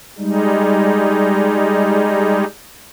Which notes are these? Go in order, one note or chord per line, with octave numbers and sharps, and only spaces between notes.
G3 G#3 D#4